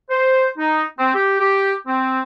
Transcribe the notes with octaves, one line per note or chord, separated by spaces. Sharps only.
C5
D#4
C4
G4
G4
C4